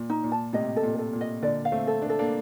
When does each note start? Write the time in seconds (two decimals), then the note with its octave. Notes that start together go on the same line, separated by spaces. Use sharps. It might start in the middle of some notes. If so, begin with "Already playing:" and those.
Already playing: A#2
0.10 D#4
0.24 A#2
0.32 A5
0.53 A2 C3 D#5
0.76 A4
0.83 A#2
0.99 A4
1.13 A#2
1.21 D#5
1.42 A#2 D3 D5
1.65 F5
1.72 A3 C4
1.87 A4
2.02 D4
2.10 A4
2.19 A#3 D4